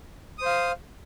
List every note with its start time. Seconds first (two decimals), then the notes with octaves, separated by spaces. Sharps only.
0.38 D#6
0.42 C5
0.46 F5